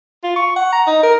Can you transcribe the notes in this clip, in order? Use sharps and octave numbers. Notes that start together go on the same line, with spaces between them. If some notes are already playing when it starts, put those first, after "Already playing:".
F4
C#6
F#5
A#5
D#4
A#4